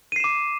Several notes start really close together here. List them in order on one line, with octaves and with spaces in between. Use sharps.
D#7 C7 E7 D6